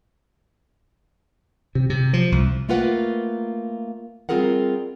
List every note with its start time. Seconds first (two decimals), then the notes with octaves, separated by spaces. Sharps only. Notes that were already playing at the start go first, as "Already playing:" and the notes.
1.75 C3
1.90 C3
2.13 F3
2.32 C2
2.68 A3 A#3 F4 A#4 B4 F#5
4.29 G3 C4 F4 G#4 A#4 F#5